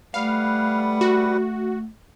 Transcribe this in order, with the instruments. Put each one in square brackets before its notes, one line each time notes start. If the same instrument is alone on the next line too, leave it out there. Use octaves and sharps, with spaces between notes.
[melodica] G3 B4 F#5 [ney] A3 [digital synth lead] F5
[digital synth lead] F#4